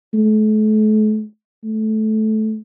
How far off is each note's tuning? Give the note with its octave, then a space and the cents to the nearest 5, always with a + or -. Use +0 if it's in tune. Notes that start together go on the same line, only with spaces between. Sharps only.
A3 -40
A3 -15